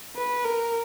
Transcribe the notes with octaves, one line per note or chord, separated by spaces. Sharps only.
B4
A#4